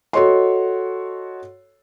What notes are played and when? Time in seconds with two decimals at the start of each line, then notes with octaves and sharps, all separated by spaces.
0.13 F#4 A4 C#5 D#5 C6